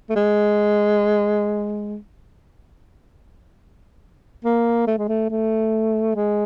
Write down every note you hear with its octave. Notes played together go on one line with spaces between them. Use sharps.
A3
G#3
A#3
A3
G#3
A3
A3
G#3